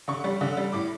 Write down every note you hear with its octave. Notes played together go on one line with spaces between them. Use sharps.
D3 C#6
G3
D3
G3
A2 D6